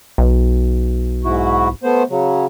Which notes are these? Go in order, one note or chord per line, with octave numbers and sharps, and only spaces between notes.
B1
G#2 E4 F#4
A3 B3 C5
C#3 F#3